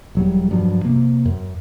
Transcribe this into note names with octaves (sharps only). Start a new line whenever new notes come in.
E1 F#3 G3
G2 F3 F#3
C3 A#3
F#2